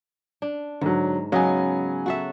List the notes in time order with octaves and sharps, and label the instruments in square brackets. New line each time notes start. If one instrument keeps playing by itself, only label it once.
[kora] D4
[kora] G#2 [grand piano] D3 F#3
[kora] C#3 B3 D#5 [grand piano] F#3 G#5
[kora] F#4 A4 E5